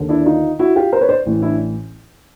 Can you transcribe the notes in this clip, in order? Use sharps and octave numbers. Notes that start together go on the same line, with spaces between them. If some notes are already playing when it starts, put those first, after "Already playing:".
Already playing: D#2 D3
D4 E4
D#4 F4
E4 F#4
F4 G4
A#4 C5
B4 C#5
C5 D5
A1 A2 E3
D4 E4